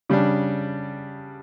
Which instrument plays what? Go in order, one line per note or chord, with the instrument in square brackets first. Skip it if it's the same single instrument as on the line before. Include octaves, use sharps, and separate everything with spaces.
[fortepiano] C#3 G3 D4